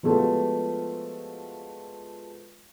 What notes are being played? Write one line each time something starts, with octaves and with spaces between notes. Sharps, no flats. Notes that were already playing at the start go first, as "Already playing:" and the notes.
F3 G#3 A3 B3 F4 F#4